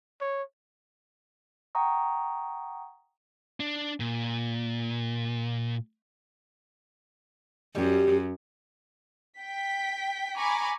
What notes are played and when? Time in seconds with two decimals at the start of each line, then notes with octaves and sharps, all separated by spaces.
0.21 C#5
1.75 F#5 G5 A#5 C#6 D#6
3.60 D4
4.00 A#2
7.75 F#2 G3 G4
9.38 G5 B6
10.37 G#5 A#5 B5 C#6 D6